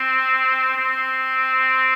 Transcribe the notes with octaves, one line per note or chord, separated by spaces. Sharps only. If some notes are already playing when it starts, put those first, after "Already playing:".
Already playing: C4
C4